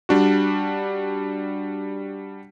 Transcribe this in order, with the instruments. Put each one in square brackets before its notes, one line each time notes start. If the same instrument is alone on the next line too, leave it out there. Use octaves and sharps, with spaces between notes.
[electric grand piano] G3 D4 F#4